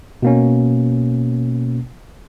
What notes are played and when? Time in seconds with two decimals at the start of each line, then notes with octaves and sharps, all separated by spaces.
0.22 B2 A#3 C#4